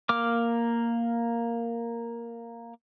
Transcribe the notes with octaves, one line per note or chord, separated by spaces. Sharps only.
A#3 D6 F6